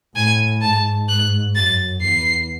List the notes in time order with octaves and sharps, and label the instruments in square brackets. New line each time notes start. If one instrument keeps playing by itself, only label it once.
[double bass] A2 [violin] G#5
[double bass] G#2 [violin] A5
[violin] F#6
[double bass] F#2 [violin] A6
[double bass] E2 [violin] C7